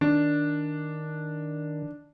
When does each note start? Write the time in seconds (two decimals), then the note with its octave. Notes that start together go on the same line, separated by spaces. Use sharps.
0.01 D#3 D4